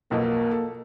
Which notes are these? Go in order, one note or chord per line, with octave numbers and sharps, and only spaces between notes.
B1 F2 B2 A#3
A4